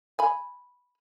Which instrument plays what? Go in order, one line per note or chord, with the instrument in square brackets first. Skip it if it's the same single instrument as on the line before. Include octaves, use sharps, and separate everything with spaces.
[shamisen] G#5 B5